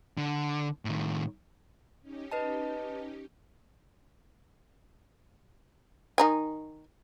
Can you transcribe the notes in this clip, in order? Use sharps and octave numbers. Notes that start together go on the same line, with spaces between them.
D3
A2 D#3
C#4 D#4 G4
B4 D#5 A5
D#3 D#4 G#5